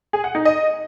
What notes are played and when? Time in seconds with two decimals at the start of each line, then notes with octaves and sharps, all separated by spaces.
0.13 G#4
0.24 F#5
0.35 D#4
0.45 D#5